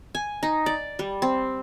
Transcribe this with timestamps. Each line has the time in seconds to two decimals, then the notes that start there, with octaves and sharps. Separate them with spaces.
0.15 G#5
0.43 D#4
0.66 D5
0.99 G3
1.22 C4